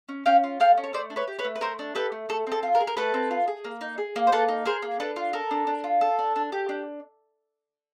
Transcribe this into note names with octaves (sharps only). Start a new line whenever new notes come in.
C#4
C#4 F5 G5
F4
A4 F5 G5
C#4
C#5
A3 C5 D5
D4
B4 C#5
G4
B4 C#5
A3
B4
A3 A#4 C5
D4
G4 A4 B4
A3
A3 A4
C4 A4
F4
A#4
G#4
A#4
A3 A4 B4
C4
F4
G#4
A#3
D#4
G#4
A#3
C5
A#3 A4 B4
D#4
G#4 A#4 C5
A#3
D4 A4 B4
F4
A4 A#4
D4
D4
F4
A4
D4
D4
G4
D4